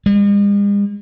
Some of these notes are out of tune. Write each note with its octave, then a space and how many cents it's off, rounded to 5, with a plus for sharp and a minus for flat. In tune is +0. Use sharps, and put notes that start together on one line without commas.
G#3 -45